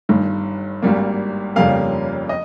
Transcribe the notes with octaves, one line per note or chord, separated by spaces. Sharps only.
G1 G2 D#3
G#1 G2 G3 A#3
G1 F2 C#3 G3 A#3 F5
D#5